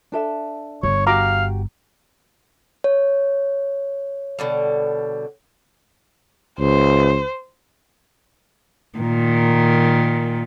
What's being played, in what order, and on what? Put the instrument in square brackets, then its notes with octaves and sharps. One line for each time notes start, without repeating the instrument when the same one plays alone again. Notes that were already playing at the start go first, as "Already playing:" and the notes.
[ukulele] D4 A4 E5
[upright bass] G1 [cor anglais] C#5
[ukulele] F#4 G4 [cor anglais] F5 [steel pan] A#5 D6
[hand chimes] C#5
[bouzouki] B2 D3 G3
[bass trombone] C#2 [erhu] C5
[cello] A#2 D#3